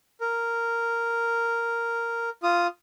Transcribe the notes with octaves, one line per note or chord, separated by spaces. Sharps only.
A#4
F4 D#6